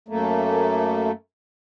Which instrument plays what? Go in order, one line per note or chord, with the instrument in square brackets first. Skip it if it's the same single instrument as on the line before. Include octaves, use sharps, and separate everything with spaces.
[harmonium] F#2 A3 A#3